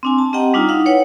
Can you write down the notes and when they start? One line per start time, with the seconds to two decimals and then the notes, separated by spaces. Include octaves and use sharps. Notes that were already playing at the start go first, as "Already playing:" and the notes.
0.03 C4 D4 G#5
0.18 A5
0.33 C4 G4 D#5 F#5 G5 A#5
0.54 G3 D4 D#4 F4
0.68 D#4 E4 F5 F#5
0.86 B4 C#5 F#5 G5